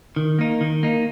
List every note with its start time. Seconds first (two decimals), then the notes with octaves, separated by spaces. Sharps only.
0.16 D#3
0.39 A#3 D#4
0.61 D#3
0.83 A#3 D#4